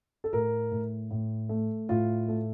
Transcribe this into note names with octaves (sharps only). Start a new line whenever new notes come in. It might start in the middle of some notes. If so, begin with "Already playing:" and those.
A4
A2 A#4
A2
A2
A3
A2 F4
A3